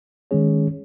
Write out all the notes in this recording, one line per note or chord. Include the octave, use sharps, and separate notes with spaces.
D#3 G#3 C#4 G#4 C#5